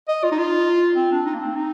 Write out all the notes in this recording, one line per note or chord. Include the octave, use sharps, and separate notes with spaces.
D#5
F4
D#4
F4
C4
D4
D#4
A#3
C4
D#4